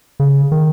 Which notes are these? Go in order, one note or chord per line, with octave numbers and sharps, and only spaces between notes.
C#3
D#3